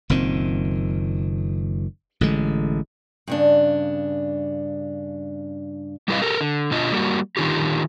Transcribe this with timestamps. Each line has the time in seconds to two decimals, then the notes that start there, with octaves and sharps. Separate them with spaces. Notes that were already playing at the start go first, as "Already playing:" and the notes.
0.10 F#1 A#2 D#3 C4
2.21 A1 D3 G#3
3.27 G2 C#3 D4
6.08 G3 A3 E4 B4 D#5 F5
6.22 G4 A4 A#4
6.41 D3
6.71 B2 D4 F4 D#5
6.92 G3 A#3 F#4
7.37 D3 D#3 D#4 F4 G4